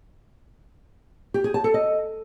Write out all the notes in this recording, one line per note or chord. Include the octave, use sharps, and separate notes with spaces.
G4
G#4
A5
A4
D#5